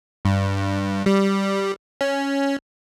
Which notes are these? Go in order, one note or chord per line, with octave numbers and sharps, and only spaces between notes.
G2
G3
C#4